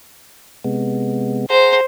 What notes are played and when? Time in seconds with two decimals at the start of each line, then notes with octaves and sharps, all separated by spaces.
0.64 C3 G#3 B3
1.50 G#4 C5 F#5 A#5